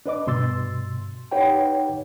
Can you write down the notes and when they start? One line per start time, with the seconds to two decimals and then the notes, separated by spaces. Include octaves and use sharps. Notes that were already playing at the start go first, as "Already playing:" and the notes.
0.06 D4 B4 D#5 D6
0.27 G2 B2 C6 E6 A6
1.31 D#4 G4 B4 C#5 F#5 G5